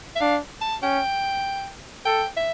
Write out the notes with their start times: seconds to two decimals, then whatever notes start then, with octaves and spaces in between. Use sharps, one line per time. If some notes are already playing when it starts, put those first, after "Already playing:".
0.16 E5
0.21 D4 F5
0.61 A5
0.82 C#4 G5
2.06 A4 G5
2.37 E5